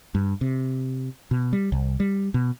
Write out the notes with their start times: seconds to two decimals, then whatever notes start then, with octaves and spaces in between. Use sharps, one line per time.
0.15 G2
0.41 C3
1.31 B2
1.53 G3
1.72 C2
2.00 G3
2.34 B2